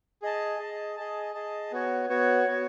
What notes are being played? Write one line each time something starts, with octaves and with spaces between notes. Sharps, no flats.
G#4 D#5 A5
G#4 D#5 A5
G#4 D#5 A5
G#4 D#5 A5
B3 F#4 C#5
B3 F#4 C#5
B3 F#4 C#5